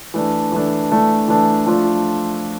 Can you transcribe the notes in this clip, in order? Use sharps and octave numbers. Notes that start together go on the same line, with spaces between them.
E3 A3 D4
E3 A3 D4
E3 A3 D4
E3 A3 D4
F3 A3 D4 F4